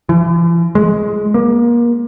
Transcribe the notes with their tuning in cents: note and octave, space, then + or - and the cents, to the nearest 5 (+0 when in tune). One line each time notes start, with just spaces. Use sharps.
E3 +45
G#3 +10
A#3 +30